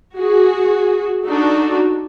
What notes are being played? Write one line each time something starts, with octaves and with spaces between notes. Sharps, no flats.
F#4 G#4
D4 D#4 F#4 A4